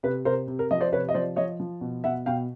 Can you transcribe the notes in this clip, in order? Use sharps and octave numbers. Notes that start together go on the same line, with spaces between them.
C3 B4
C3 A#4 C5
C3
A#4
F3 D#5
C5 D5
C3 B4 C#5
D#5
F3 C5 D5
F3 C#5 D#5
F3
B2
B2 E5 F#5
B2 F5 G5